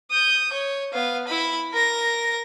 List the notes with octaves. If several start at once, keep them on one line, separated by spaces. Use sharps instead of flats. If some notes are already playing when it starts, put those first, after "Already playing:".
D#6 G6
C#5
B3 F5
E4 B5
A#4 A#6